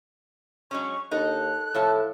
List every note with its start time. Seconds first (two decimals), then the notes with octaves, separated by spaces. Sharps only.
0.71 F#3 G#3 C#4 C#6
1.11 D#2 D#4 A4 F#6
1.74 A2 F3 A4 A5